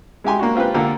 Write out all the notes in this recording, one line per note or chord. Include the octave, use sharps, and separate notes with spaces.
G#3 E4 G4 G#5 C6
A#3 D4 F#4
C4 F4 G4 B4
D3 A#3 F4 G4 A4